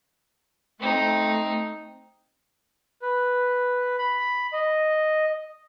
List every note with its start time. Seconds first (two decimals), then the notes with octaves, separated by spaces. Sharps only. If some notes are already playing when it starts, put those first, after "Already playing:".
0.80 A3 C4 D#4
3.02 B4
3.98 B5
4.53 D#5